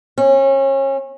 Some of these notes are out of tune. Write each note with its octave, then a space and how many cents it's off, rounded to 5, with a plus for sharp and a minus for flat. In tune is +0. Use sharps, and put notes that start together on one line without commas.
C#4 -30